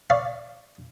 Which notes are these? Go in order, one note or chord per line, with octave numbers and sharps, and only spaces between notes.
C#5 D5 F5